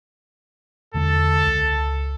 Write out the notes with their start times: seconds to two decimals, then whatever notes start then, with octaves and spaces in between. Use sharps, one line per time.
0.94 E2 D3 G#3 A4
1.46 C#2